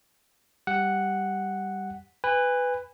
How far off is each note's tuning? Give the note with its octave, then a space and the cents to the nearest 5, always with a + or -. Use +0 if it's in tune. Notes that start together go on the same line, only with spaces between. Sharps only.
G3 +0 G4 +0 F#5 +0
B4 +10 G#5 -30